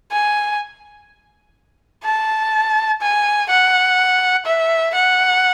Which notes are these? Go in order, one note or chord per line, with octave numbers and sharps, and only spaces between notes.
G#5
A5
G#5
F#5
E5
F#5